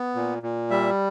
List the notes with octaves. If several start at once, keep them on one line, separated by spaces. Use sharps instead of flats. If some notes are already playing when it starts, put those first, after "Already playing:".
Already playing: B3
A#2
A#2
G3 E5